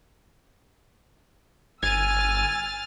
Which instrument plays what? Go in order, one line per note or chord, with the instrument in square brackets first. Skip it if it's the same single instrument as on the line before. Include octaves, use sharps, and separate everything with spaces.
[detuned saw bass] G1 [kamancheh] G#5 E6 [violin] F6 A6 [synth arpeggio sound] G#6 D#7